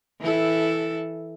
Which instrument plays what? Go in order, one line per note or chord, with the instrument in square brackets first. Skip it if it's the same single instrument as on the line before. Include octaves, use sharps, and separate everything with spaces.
[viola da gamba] E3 E4 A4